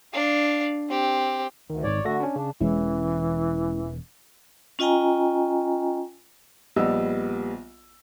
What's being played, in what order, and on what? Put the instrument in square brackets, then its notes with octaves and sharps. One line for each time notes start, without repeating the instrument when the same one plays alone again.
[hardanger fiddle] D4 F5
C4 G4
[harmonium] D2 [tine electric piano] D#3
[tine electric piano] G#1 G#2 [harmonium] C#5 D5
[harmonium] D3 F#4 [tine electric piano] A3 A4 A#6
[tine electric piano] C#4 D4
[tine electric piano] C#3 [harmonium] D4
[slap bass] E1 [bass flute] E3 [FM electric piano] G#3 C#4 E4
[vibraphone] C#4 F4 D#5 G5 G#5 A#5
[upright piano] A#1 G3 B3 D#5 E6